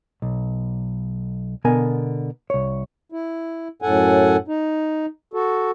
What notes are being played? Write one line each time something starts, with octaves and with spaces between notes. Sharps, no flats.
B1
B2 D3 B3 A#4 G#5
C2 C#5
E4
F#2 A2 A4 F#5 G#5
D#4
F#4 A4